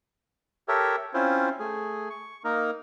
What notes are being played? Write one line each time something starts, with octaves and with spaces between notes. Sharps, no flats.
G4 A4 A#4 C#5 E5
C4 C#4 E4 F4 C5
A3 G#4
C#6
A#3 D#4 A#4